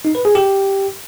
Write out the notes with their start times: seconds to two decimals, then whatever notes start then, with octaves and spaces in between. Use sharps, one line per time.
0.05 D#4
0.15 B4
0.25 G#4
0.35 G4